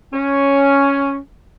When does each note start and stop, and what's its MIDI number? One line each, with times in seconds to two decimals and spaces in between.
0.13 1.17 61